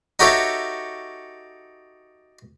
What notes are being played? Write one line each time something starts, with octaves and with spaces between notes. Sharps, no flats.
D#4 F#4 G4 A4 C#5 E5